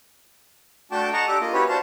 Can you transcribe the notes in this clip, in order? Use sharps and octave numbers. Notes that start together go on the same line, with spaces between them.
A3 D4 F#4 G5 A5 D6
D#5 F#5 A5 A#5 C#6
D4 G4 A4 D6
A#3 F4 D#5
C#4 E4 F#4 G4 B4 C#5
D4 F#4 C5 F5 A5